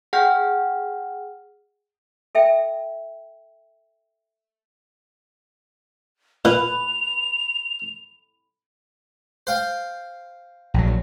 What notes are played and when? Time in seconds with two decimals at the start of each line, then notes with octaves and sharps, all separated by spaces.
0.13 G#4 F#5 G5 F6 G6
2.35 A4 E5 G5
6.45 A#2 B4 F7
9.47 C5 F5 G5
10.74 A#1 F#3